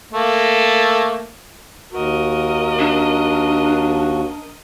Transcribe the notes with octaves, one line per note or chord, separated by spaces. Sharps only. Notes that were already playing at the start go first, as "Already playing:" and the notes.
A3 A#3
D#2 F#4 A#4 D#5
D4